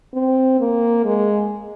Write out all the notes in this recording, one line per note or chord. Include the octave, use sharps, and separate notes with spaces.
C4
A#3
G#3